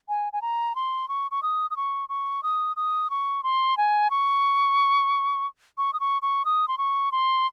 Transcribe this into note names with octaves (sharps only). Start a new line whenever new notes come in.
G#5
G#5
A#5
C6
C#6
C#6
D#6
D#6
C#6
C#6
D#6
D#6
C#6
C6
G#5
C#6
C#6
D#6
C#6
C#6
D#6
C6
C#6
C6